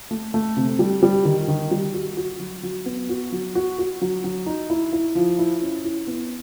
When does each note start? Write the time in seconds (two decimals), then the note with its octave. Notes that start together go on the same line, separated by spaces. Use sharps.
0.11 A3
0.34 A3
0.57 C3
0.79 G3
1.03 G3
1.25 D#3
1.48 D#3
1.71 G3
1.94 F#4
2.17 F#4
2.40 F#3
2.63 F#3
2.86 B3
3.09 F#4
3.32 F#3
3.55 F#4
3.78 F#4
4.01 F#3
4.24 F#3
4.46 D#4
4.70 E4
4.93 E4
5.15 F3
5.39 E4
5.62 C#4
5.84 E4
6.07 B3